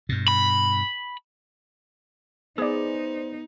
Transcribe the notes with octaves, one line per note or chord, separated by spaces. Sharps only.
G2 B2
B5
B3 D#4 G#4 C5 D5